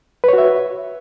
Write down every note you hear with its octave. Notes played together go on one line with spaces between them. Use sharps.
F#4 B4 C#5 E5